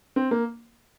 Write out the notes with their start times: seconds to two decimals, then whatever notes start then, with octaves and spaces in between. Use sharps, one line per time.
0.16 C4
0.31 A#3